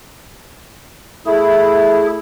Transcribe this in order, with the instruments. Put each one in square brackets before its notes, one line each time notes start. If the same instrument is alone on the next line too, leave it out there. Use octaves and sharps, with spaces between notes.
[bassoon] A3 [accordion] E4 [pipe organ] G#4